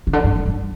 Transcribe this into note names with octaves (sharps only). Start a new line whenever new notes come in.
C#3
D3
G2
G2
F#2